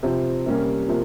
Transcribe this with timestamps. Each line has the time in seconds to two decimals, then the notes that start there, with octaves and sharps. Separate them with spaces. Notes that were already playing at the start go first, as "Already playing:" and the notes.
0.03 C3 F3 C4
0.46 C3 G3 A#3 C#4
0.88 C3 F3 A#3